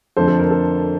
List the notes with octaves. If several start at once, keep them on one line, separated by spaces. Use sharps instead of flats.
F2 D3 F3 A3 A4 C5
A4
A#4
A4